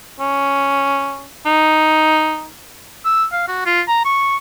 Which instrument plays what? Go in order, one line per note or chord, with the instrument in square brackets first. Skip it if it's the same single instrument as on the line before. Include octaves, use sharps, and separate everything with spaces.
[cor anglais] C#4
D#4
[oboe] E6
F5
F#4
F4
A#5
C#6